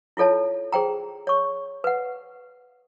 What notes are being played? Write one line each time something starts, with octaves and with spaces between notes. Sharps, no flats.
E4 F4 A4 C#5 A5
G#4 C5 G5 A#5
C#5 C#6
B4 F#5